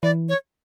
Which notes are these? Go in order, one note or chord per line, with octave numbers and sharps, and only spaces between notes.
E3 D5
C#5